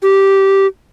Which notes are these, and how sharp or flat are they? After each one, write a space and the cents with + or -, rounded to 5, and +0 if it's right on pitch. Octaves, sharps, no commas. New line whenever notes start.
G4 -10